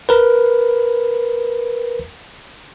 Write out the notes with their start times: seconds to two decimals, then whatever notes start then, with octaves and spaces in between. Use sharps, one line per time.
0.09 A#4 B4